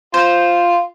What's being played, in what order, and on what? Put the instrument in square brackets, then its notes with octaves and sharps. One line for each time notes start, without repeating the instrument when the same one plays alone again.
[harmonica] F4 [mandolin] C5